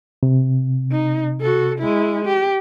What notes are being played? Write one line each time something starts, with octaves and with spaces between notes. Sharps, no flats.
C3
D#4
F#4 A4
G#3 E4
G4